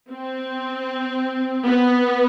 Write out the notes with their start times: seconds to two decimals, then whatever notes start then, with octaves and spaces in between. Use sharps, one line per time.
0.11 C4
1.66 B3